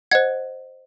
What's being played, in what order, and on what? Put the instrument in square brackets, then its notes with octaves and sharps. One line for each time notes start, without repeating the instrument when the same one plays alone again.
[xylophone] C5 D#5 F#5 G#6